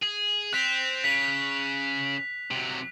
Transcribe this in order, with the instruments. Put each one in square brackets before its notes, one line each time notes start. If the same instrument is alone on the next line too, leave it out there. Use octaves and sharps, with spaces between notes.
[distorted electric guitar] G#4
[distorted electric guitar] C4 [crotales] F#6 B6 F7
[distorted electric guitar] C#3 [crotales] B6
[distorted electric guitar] C3 F#3